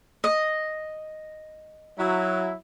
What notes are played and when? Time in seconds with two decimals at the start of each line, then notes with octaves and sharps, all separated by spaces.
0.24 D#5
1.99 F#3 E4